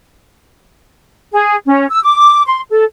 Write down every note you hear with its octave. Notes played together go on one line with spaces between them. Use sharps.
G#4
C#4
E6
D6
C6
A4